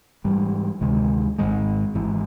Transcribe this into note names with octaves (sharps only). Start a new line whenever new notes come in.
G#2 E3 G3
D2 C3 D#3 G#3
G#1 G#2 D#3 G#3
G#1 G#2 E3